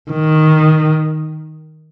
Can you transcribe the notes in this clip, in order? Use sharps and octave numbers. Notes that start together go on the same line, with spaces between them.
D#3